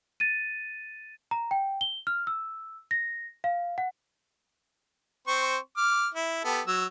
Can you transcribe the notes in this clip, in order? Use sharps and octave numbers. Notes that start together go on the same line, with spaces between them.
A6 D#7
A#5
G5
G7
F6
E6
A#6
F5
F#5
C4 C5 C#6
D6 F6
E4
B3 G4 A4
F#3 E6